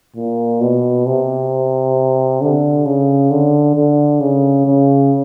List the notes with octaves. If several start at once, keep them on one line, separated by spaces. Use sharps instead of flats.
A#2
B2
C3
D3
C#3
D3
D3
C#3
C#3